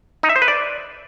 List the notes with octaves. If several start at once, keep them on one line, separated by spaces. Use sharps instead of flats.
D#4
E5
C5
B4
D5